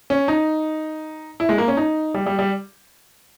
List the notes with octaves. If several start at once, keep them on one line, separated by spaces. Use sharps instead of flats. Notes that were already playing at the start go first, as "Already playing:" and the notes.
C#4
D#4
E4
G#3
A#3
C#4
D#4
G3
G3
G3